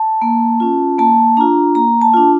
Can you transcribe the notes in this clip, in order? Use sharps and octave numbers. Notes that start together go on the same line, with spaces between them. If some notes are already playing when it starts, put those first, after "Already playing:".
Already playing: A5
A#3
C#4 F4
A#3 A5
D4 F4 A#5
A#3 A#5
A5
D4 F4